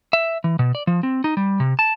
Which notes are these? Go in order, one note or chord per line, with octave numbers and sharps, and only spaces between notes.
E5
E3
B2
D5
F3
C4
D#4
G3
C3
A5